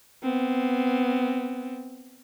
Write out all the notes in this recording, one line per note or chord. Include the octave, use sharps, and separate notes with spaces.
B3 C4